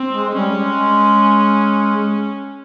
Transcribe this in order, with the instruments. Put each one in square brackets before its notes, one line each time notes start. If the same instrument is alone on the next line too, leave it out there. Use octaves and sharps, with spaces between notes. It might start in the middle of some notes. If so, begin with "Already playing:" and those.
Already playing: [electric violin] C4
[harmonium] G#3
[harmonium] G3 [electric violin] C#4
[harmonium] G#3